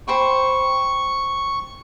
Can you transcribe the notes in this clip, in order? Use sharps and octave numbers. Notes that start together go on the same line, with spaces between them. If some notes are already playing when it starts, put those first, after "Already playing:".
C5 G5 B5 C#6